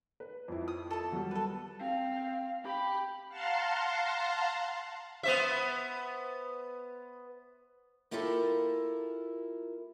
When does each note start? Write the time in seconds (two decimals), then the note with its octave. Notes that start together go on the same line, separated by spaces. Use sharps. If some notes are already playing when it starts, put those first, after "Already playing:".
0.20 B4
0.48 F2 E4
0.68 D#6
0.91 A4 A5
1.12 F#3 G3
1.31 A4 B4
1.81 C4 F5
2.65 G4 G5 B5
3.29 F5 F#5 A5 A#5 C6
5.23 B3 C5 E5
8.11 A#3 E4 F4 G4 A4 A#4